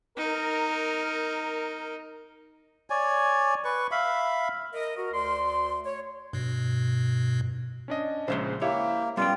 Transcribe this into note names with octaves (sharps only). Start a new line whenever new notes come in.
D#4 A#4
C#5 D5 G#5
B4 C#6
E5 F5 B5
A#4 D#5
F#4 A#4
D2 D5 C6
C#5
G2 B2
C#4 D4 D#5
A#1 C#3 G#3 C5 E5 C6
A#3 E4 G4 C#5 E5
G3 B3 C#4 F4 G5